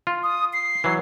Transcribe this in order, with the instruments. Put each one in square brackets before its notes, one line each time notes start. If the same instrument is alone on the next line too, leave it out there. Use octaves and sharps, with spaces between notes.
[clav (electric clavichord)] F4
[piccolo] D#6
C7
[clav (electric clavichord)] E3 F#3